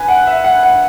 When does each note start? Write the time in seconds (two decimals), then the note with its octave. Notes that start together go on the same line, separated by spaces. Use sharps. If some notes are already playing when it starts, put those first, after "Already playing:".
Already playing: B4 G#5
0.08 F#5
0.27 E5
0.44 F#5
0.63 F#5